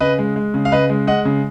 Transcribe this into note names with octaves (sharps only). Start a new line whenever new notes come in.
C#3 B4 D#5
G#3
G#3
C#3
F5
C#3 B4 D#5
G#3
G#3 D#5 F#5
C#3